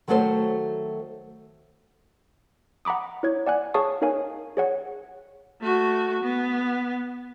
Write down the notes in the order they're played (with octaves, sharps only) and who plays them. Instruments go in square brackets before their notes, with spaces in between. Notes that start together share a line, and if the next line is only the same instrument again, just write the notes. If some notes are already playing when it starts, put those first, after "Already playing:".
[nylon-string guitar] D#3 F#3 A3 F#4 A4 C5
[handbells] F#5 A#5 B5 D6 D#6
E4 C#5 G#6
D5 F#5 G#5 F#6
G#4 C#5 F5 A5 C#6 D#6
D#4 A#4 C#5 F5 G#5
G#4 C#5 F#5
[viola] A3 F#4
B3